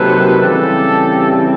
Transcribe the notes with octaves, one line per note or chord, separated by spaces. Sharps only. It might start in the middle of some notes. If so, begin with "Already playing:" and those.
Already playing: C3 D#3 F#3 A#3 A4 B4
C#3 E3 G3 C4 G4 A4